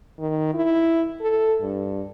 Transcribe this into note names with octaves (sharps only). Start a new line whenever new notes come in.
D#3
E4
A4
G2